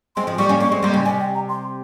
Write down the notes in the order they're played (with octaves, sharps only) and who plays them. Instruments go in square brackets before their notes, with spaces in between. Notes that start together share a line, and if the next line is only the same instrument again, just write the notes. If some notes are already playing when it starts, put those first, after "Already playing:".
[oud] G#3 C4 [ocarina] C6
[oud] F3 G#3
[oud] G3 A#3 [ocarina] C#6
[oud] A#3 C#4
[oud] A#3 C#4 [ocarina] C#6
[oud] G#3 C4
[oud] G3 A#3 [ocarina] C6
[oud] C#3
[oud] C3 [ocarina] G#5
[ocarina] G5
A#5
C6